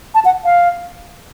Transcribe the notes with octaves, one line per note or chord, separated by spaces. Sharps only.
A5
F#5
F5